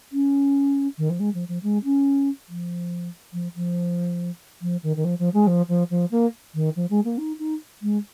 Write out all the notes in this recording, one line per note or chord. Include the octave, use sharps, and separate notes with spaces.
C#4
D#3
F3
G#3
F3
F3
G#3
C#4
F3
F3
F3
F3
D#3
D#3
F3
F3
G#3
F3
F3
F3
A#3
D#3
F3
G#3
A#3
D#4
D#4
G#3